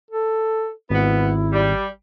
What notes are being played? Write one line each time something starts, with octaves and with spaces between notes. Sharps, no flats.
A4
G#1 B3 E4
G3